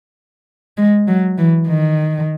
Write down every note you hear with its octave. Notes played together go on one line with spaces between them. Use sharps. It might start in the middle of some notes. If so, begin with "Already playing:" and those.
G#3
F#3
E3
D#3